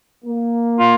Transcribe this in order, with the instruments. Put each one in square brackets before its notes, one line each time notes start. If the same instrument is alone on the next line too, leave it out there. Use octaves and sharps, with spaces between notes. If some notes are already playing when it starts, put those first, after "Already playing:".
[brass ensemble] A#3
[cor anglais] F4